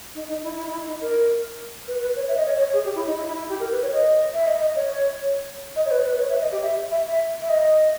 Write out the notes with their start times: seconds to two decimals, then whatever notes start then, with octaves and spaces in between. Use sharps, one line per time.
0.15 D#4
0.29 D#4
0.44 E4
0.57 E4
0.67 D#4
0.72 E4
0.86 D#4
1.01 A#4
1.88 B4
2.02 B4
2.16 C#5
2.28 E5
2.37 D#5
2.45 C#5
2.59 C#5
2.73 G#4
2.84 G4
2.95 E4
3.06 D#4
3.17 E4
3.28 E4
3.39 E4
3.49 G4
3.60 A#4
3.71 B4
3.82 C#5
3.93 D#5
4.34 E5
4.47 D#5
4.61 D#5
4.76 C#5
5.76 D#5
5.85 C#5
5.91 B4
6.05 B4
6.19 C#5
6.30 E5
6.41 D#5
6.52 G4
6.62 E5
6.91 E5
7.06 E5
7.42 E5
7.49 D#5